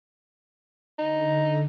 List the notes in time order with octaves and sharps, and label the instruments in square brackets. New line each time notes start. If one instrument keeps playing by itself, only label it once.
[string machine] D3 [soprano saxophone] D#4